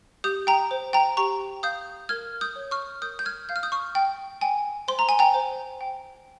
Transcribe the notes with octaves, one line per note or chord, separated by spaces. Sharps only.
G4 D#6 G6
G5 A#5
C5
G5 A#5
G4 A#5 C#6
F5 D#6 G6
A#4 F6 G#6
D#6 G6
C#5
C#6 F6
A#4 D#6 G6
G6
F6 G#6
F5 G6
F6
D#6 G6
C#6 F6
G5
G5 G#5
C5 C6
A#5
G#5
G5 A#5
C5
G5